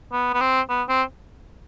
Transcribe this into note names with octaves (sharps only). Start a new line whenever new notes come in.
B3
B3
C4
B3
C4